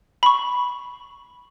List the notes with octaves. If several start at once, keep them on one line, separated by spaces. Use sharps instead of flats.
B5 C#6